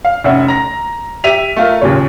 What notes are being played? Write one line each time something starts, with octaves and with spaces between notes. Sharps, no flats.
F5
F1 C#4 E5 F#5
A#5 A#6
G4 E5 B6 D#7 F7
A3 F4 A#4
D#2 A#2 C#3 C#5